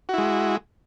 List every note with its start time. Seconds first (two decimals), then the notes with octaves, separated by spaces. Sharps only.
0.09 F#4
0.14 E4
0.18 G#3